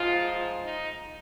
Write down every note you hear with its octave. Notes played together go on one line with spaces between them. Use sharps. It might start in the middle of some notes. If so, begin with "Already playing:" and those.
Already playing: G#2 F3 G#3 F4
D#4